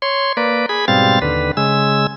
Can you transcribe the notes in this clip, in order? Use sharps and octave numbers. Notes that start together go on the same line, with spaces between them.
C#5 C6
A#3 B4 D5
G#4 B5
G#2 B2 G3 C4 F5 A6
D#2 D3 B4
C#3 G#3 E6